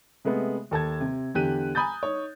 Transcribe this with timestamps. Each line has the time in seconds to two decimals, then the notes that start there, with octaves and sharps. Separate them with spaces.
0.25 C3 G#3 A3 B3
0.71 D#2 A4 A5 G#6
1.01 C3
1.34 E2 D3 G4 F#6 D#7
1.75 G#5 A#5 B5 D#6 G6 A6
2.03 D#4 C#5